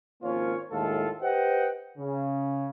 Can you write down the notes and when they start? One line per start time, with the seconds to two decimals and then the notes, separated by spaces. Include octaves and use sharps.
0.23 G#1 F3 A#3 C#4 F4 C#5
0.72 D#2 A2 G#3 F4 A4
1.23 G4 B4 C5 D#5 F#5 G5
1.98 C#3